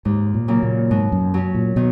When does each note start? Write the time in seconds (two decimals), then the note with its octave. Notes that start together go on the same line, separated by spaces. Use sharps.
0.05 D#2 G#2
0.34 A#2
0.48 C#3 F#3 A#3
0.63 A#2
0.91 G#2 B2
1.12 F#2
1.34 F#3 C#4
1.55 A#2
1.76 B2 D#3